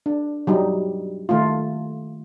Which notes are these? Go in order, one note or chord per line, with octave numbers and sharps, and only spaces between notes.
D4
F#3 G3 D#4
D#3 A3 F4